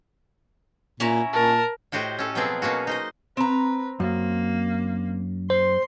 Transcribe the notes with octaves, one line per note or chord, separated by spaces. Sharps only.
A#2 C#4 E4 A#5
A#2 A#4 A5
A2 F#4 G4 C5 D#5
C#4 A4
B2 F3 F#3 B3 C4 G#4
B2 A#3 C#4 F#4
D#4 C5 D#5
C4 B4 A#5
F#2 A#3
C5 C6